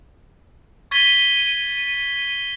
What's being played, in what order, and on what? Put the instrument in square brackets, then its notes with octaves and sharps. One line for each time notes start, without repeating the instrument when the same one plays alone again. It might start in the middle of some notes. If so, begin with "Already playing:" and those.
[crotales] C#6 G#6 A6 B6 D#7 G7